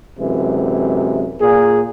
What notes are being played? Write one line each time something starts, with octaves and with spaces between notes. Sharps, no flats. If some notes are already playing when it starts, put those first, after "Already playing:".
F#2 C3 E3 G#3
A#2 G#4